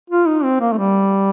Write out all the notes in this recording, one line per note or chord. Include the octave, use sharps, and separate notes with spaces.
F4
D#4
C4
A#3
A3
G3